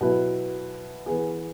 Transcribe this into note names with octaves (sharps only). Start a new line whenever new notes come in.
B2 F#3 E4 B4
E3 B3 G#4